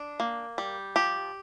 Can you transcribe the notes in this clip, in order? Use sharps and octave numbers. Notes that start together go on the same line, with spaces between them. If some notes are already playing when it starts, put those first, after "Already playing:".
Already playing: D4
A#3
G3
F3 G4